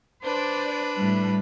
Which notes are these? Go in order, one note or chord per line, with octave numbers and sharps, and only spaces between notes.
D4 B4 C5 D5
A2 G3